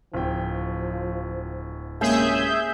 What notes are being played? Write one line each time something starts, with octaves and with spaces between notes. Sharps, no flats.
D1 F3 G5
C3 G#3 A#3 C#4 G#4 E5 G6